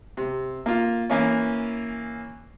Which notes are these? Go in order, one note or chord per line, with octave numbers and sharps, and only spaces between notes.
C3
A#3 F4
E3 A#3 C#4